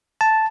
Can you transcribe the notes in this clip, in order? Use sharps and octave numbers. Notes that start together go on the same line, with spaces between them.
A5